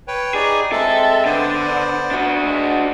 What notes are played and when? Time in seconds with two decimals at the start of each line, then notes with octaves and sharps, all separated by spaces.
0.08 B4 C#5 G5
0.34 D#4 G4 G#4 D5
0.72 G#3 C4 A4 E5
1.25 D3 B3 C5 D5
2.11 D4 F#4
2.45 G#3